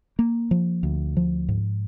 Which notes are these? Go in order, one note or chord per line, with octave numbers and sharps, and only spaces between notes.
A#3
F3
D2
F3
G#2